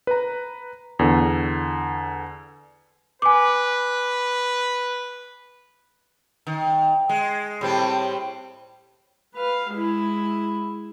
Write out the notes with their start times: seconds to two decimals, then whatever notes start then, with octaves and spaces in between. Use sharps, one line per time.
0.07 B4 A#5
0.99 E2 D3
3.22 B4 G#5 D6
6.47 D#3
7.09 G#3
7.61 A2 G3 C4
9.35 B4 F5
9.72 G#3 E4